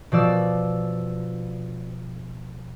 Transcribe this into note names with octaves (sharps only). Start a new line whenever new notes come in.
B2 F3 D5 E6